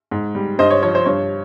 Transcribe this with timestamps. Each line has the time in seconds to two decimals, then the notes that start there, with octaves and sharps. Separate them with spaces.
0.11 G#2
0.35 G3
0.59 G2 C5 D#5
0.71 C#5
0.82 F3 C#5
0.95 C5
1.06 G2 C#5